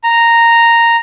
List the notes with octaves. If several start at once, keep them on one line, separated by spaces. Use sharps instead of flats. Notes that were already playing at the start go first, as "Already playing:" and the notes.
A#5